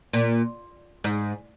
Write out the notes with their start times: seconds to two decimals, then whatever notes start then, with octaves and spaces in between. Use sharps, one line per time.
0.13 A#2
1.04 G#2